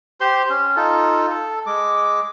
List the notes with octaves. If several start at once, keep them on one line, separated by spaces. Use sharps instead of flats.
G4 C5 C6
C#4
D#4 F4 A4
A4
G#3 D6